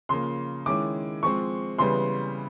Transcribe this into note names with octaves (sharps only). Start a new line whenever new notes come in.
C#3 F3 A#3 C6
D#3 G#3 C#4 E4 D6
F3 G#3 C4 C#6
C#3 E3 G3 B3 C6